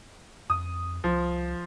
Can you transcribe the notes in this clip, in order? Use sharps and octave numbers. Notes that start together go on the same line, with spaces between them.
F2 D#6
C2 F3